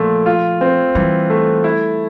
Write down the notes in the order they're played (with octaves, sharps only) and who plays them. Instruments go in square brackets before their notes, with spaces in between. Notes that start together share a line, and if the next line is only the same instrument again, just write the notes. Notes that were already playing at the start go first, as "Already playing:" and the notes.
Already playing: [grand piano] A#2 A3 [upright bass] F3
[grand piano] F4
C4
[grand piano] E3 [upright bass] G3
[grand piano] A3
E4